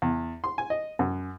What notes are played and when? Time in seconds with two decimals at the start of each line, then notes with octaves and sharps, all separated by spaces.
0.02 E2
0.44 C6
0.58 G#5
0.70 D#5
0.99 F#2